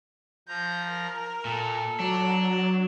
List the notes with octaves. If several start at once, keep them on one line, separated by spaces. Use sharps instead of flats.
F3 A#5 G6
A#4
A#2 A4
F#3 D4 A#5